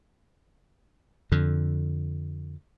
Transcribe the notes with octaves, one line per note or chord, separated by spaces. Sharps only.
F2 D3